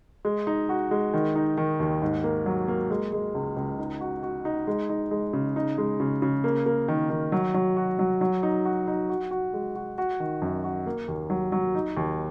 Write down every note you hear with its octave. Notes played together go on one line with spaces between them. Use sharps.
G#3
D#4
F#4
G#3
D#3
D#4
D#3
D#2
G#2
A#3
F#3
A#3
G#3
G#3
C#2
C#2
D#4
F#4
F#4
D#4
G#3
D#4
G#3
C#3
D#4
G#3
C#3
C#3
A#3
A#3
D#3
D#3
F#3
F#3
F#4
F#3
F#3
D#4
F#4
D#4
F#4
F#4
G#3
F#4
F#4
D#3
F#2
F#4
A#3
D#2
F#3
F#3
D#4
D#2